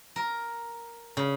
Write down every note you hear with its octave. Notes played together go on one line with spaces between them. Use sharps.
A#4
C#3